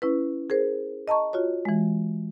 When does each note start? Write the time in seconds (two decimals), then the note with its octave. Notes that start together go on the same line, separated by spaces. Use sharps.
0.02 C#4 E4 B4
0.50 G#4 A#4 C5
1.08 D#5 A5 A#5 C#6
1.33 F4 F#4 C#5
1.65 E3 G#3